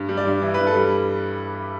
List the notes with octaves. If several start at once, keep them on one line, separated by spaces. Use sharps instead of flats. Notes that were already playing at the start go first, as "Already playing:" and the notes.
Already playing: G2
G3
D5
G2
E3
B4
G2
A4
G3